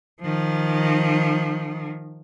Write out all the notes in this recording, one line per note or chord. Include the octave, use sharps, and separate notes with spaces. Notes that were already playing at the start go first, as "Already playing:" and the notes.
D#3 F3